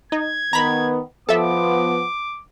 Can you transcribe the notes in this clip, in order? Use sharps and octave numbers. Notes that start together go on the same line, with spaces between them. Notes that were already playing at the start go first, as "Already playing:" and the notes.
D#4 G#6
D#3 B3 A#5 B5
F3 B3 A4 E5 D6